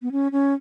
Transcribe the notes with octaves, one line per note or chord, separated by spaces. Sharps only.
B3
C#4
C#4